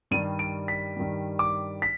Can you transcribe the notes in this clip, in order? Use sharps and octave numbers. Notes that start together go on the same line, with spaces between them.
G2 D#3 G3 D#7
D7
B6
G2 D#3 G3
D6
B6